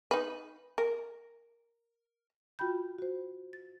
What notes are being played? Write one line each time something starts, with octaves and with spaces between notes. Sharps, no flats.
D#4 B4
A#4
F4 F#4 G5 B5 G6
F#4 C5
A6